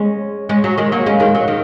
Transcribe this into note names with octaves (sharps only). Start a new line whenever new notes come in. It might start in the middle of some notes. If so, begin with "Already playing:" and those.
Already playing: G#3 C#4
G#3 C#4
F#3
D#3 G#3
F#3 A#3
G#3 C#4
D#3 G#3
F#3
D#3